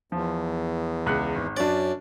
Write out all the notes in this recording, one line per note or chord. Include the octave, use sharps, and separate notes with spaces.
E2 F3
C#2 F#6 C#7
G#1
F#2 C#4 D4 D5